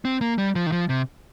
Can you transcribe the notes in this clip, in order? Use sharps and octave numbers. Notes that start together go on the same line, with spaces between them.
C4
A#3
G3
F3
D#3
F3
C3